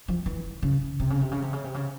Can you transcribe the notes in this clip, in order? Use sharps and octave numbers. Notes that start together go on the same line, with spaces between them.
F3
E3
C#3
C3
C#3
C3
C#3
C3
C#3
C3
C#3